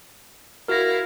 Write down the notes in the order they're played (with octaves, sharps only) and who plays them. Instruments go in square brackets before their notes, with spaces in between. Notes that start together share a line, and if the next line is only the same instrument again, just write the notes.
[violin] E4 F5 [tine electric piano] F#4 A#4 [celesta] F6 A#6